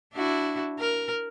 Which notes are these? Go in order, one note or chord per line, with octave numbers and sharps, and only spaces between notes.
D4 E4 F#4
A#4